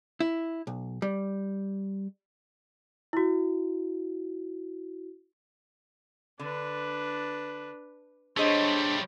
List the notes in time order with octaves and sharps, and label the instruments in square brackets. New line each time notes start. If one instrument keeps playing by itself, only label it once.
[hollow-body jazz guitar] E4
B1
G3
[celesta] E4 F#4
[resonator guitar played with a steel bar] D3 [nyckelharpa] D4 B4
[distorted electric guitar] G3 A3 [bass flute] D4 [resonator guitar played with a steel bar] G#4 D#5 [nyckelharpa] C5 C#5